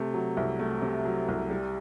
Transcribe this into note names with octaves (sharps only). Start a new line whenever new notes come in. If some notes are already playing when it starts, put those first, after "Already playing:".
Already playing: C3 A3
F#3
C2
A3
C3
F#3
C2
G3